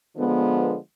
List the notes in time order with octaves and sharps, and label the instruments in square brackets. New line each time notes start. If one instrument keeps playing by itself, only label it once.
[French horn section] D3 F3 G#3 B3